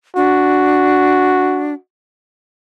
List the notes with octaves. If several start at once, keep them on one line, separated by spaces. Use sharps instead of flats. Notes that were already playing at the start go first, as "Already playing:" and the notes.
D4 F#4